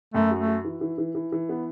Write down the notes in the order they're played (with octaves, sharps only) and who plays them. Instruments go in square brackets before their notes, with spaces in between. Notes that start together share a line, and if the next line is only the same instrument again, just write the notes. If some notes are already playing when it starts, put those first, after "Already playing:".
[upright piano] F#2 [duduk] A3
[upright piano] F#4
[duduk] A3
[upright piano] F#4
E3
E3
E3
E3
E3
B3